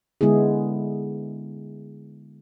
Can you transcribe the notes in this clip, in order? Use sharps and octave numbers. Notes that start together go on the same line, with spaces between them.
D3 G#3 B3 E4 G#4